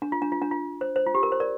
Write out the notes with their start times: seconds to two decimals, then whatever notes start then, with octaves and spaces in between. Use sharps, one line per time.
0.02 D4
0.12 F4
0.22 D4
0.32 F4
0.42 D4
0.51 F4
0.81 C5
0.96 C5
1.06 F4
1.14 G4
1.23 A#4
1.32 C5
1.40 A#4 D5